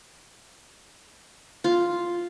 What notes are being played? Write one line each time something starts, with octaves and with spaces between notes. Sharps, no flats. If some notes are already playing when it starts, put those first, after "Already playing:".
F4